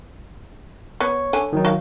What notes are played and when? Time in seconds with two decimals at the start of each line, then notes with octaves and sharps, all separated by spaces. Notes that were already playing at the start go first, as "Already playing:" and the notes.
1.00 B3 C#5 C#6
1.33 D3 G#5
1.53 D#3 F#3 D#4
1.65 F#4 F5